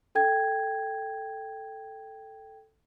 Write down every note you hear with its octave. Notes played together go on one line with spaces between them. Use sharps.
A4 G5 G#6